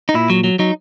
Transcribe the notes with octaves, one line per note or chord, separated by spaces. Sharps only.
D#4
A#2 E4
F#3
F#3
F#3 D#4